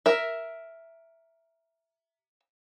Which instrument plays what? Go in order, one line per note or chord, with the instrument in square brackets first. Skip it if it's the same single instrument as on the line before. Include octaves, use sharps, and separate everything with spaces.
[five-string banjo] A#4 E5